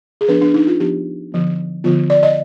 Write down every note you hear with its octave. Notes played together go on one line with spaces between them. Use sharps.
G#4
F3 B3 D4 B4
D4
D#4
F4
F3 B3 D4 G4
D3 F3 B3
D3 F3 B3 F4
D5
D#5